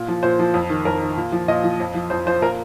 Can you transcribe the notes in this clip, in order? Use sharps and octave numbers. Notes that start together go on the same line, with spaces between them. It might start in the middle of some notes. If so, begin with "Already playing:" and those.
Already playing: A#2
F3
A#2 C5
F3
F2
D#3
F2 A#4
D#3
A#2
F3
A#2 D#5
F3
F2
F3
F2 C5
F3 C5
A#2 A#4